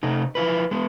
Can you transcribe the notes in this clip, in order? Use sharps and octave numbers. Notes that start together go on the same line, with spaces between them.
C3 A3 D#4
F3 E4 F4 B4
G#3 B3